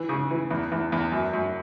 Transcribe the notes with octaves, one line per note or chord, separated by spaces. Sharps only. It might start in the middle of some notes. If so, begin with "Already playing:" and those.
Already playing: E3
C#3
E3
E2
E2
E2
F#2
F#2